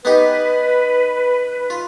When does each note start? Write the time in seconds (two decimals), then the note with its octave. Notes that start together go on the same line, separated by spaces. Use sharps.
0.05 B3 D#4 G4 B4
1.70 F4